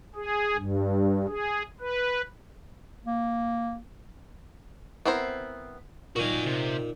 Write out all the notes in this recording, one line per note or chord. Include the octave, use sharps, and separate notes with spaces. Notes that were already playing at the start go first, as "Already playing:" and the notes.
G#4
G2
G#4
B4
A#3
B3 C4 E4 A#4 C5
A#2 D#3 F#4 G#5
C3